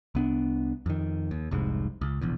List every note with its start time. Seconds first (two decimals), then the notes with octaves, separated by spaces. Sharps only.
0.15 C2 B3 D4
0.86 F2 D#3
1.31 D#2
1.51 F1 C2 G#2
2.01 C#2
2.21 E1 A#1 E2